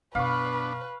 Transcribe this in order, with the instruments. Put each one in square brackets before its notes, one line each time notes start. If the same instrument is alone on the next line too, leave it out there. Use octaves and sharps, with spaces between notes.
[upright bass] F#2 B2 [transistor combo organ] B3 D4 [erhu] B4 [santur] F5 C#6